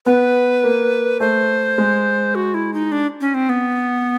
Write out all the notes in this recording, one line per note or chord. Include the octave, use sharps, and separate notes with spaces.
B3 B4
A#3
A3 C5
G#3
F#4
E4
D#4
D4
C#4
C4
B3